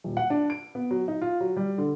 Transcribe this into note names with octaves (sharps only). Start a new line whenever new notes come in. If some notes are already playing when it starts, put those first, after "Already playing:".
D#1
F#5
D4
D7
B3
F#3
D#4
F4
F#3
G3
D3